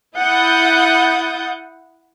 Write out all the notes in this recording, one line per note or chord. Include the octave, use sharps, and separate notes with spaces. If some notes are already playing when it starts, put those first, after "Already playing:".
E4 F#5 D#6 G6 A6